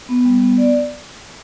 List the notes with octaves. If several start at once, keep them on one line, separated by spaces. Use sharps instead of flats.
B3
G3
B3
D5